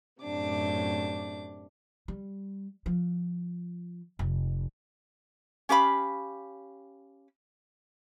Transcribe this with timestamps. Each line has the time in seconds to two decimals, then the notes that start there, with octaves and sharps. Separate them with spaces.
0.23 F#2 A2 C3 D4 D6
2.08 G3
2.86 F3
4.19 F1
5.69 C#4 G4 F5 B5